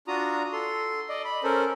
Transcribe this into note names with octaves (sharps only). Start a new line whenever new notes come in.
D4 F4 F#4 A#5 D#6
A4 C6
D5 D#5
B5
C#4 A4 A#4 C5